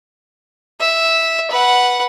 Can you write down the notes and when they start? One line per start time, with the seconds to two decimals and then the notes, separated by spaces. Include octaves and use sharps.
0.80 E5
1.50 B4 F#5